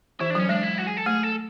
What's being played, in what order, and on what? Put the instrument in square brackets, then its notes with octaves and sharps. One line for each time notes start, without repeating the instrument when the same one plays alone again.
[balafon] E3 [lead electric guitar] E4
[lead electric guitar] D4
[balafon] F#3 [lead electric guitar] C#4
[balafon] G#3 [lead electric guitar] D4
[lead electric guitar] E4
F#4
G#4
A4
[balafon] A3 [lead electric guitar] G#4
[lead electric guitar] A4